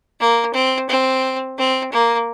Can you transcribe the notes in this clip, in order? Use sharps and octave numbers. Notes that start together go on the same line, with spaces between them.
A#3
C4
C4
C4
A#3